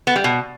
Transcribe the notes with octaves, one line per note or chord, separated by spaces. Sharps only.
B3
G3
B2